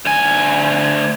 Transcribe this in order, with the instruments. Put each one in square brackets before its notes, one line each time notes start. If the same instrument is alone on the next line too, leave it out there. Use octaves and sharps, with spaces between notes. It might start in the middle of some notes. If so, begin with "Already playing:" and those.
[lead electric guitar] D2 G#5